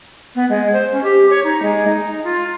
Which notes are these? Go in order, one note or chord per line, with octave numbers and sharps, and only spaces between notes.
B3
G#3
C5
C#4
G4
C#5
D#4
G#3
D#4
F4